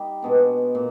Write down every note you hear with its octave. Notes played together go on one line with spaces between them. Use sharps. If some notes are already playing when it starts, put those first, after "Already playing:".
Already playing: G3 D#4 G4
B2 G#3 B3 D4
A#2